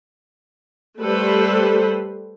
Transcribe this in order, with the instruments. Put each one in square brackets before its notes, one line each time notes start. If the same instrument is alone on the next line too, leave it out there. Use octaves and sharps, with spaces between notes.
[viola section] G3 A3 A4 B4 C5